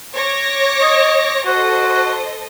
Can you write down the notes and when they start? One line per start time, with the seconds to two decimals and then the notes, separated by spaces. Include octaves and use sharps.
0.15 C#5 D6 A#6
0.82 D#5
1.46 F#4 A4 C5 D#5